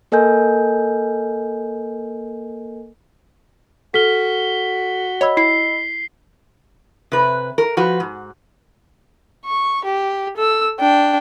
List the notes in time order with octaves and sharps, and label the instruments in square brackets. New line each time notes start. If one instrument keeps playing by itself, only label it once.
[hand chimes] A#3 A4 A#4 D#5 G#5 G6
[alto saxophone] F#4 [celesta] A4 F6 [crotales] B6 G7
[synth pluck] C#5 [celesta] D#5 B5 E6
[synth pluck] E4 [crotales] C7
[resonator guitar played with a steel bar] C3 B4
A#4
F3 F#4 B4
G#2
[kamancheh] C#6
G4
A4 E6
D4 G5